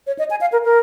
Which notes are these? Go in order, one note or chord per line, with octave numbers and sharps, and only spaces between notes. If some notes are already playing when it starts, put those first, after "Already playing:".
C#5
D#5
G#5
F5
A#4
A#4